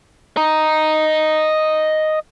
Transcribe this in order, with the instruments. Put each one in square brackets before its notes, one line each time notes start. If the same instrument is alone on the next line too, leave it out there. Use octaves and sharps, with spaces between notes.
[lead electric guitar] D#5 A#5